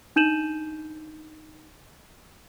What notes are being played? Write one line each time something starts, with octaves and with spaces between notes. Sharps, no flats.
D4 D#4 G6 D#7 E7 F#7